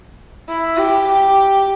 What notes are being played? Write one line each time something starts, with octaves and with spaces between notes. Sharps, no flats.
E4
G4
G4